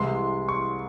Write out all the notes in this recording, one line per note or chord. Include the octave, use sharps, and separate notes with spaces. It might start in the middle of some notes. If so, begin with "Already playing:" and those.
Already playing: C2 C3 E3 G#3 C6
C#6